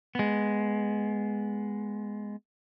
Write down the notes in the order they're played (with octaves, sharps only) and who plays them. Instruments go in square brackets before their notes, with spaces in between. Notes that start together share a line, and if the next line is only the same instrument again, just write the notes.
[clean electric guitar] G#3 B3